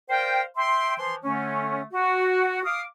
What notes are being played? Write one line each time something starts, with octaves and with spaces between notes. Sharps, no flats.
A#4 C5 D5 F5 G5
E5 G5 C6
E3 F3 C6
D3 A3 C#4
F#4
F5 D6 D#6 F6